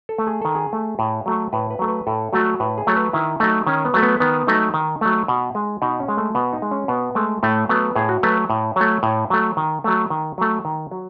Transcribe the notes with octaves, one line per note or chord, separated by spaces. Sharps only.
A4
A3
G#4
D#3 A4
G#4
A3
A2
F#3 A3
A2 B4
B4
F#3 A3
B4
A2 A4
F#3 A3 F#4
A2 B4
G#4
F#3 A3 C#5
B4
D#3 E4
F#3 A3 D#4
D#3 C#4
B3
F#3 A3
B3
D#3 B3
F#3 A3 D#4
D#3
F#3 A3
B2
G#3
B2 D#4
C#4
G#3
A3
B2 B3
D#4
G#3
C#4
B2 B3
G#3 A3
A2 A3
F#3 A3 B3
A2 G#4
F#4
F#3 A3 B4
A2
F#3 A3 C#5
A2
F#3 A3
D#3
F#3 A3
D#3
F#3 A3
D#3
F#3